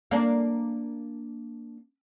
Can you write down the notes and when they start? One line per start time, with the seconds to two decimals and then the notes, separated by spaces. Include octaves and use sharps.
0.11 A#3 D4